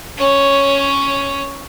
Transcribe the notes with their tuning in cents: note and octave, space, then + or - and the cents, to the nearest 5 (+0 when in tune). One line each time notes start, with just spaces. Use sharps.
C#4 +0 C#5 +0